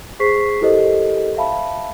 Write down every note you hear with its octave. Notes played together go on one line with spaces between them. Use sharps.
G#4 C5 C#6 B6 C7
E4 G4 A4 A#4 C5 D#5
E5 F5 A5 B5